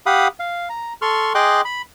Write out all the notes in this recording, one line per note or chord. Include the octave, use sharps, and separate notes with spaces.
G4 F5 F#5 B5 D#6
F5
A#5
A4 C6 C#6 F6
G#4 D#5 G5 C6 D6 F#6
B5